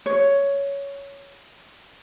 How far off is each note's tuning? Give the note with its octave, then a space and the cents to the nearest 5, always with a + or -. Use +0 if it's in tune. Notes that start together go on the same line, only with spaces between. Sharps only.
C#5 +10